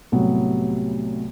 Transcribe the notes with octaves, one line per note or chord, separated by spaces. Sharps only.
C2 A2 C3 F#3 B3